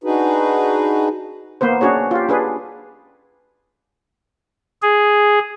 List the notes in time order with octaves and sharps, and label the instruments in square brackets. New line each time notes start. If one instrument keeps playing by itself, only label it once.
[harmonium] D4 D#4 F#4 G#4 B4
[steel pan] A#3 B3 B4 C5
C#4 D4 F#4 G#4 C#5
F4 G4
D4 G#4 B4
[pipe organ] G#4